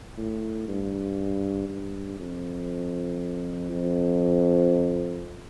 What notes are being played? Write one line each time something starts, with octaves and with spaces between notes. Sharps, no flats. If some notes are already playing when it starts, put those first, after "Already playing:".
A2
G2
G2
F2
F2